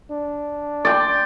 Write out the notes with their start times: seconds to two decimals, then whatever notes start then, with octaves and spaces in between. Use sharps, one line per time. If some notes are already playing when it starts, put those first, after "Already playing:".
0.11 D4
0.85 D5 G5 C6